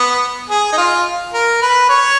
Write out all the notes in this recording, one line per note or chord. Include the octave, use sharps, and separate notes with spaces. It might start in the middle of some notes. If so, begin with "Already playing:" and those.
Already playing: B3
G#4
D#4
F4
A#4
B4
C#5